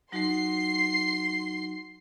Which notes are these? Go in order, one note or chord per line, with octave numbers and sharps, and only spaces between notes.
F#3 D#4 F#4 C6 C7